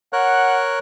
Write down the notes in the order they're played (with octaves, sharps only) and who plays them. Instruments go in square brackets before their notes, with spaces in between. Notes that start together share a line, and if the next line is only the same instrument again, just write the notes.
[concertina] A#4 C#5 F#6 [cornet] F#5